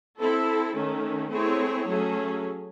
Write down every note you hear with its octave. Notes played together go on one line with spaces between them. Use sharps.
C4 E4 A4
D#3 A3 C#4
A3 C4 E4 G#4 C#5
F#3 A3 C#4 G#4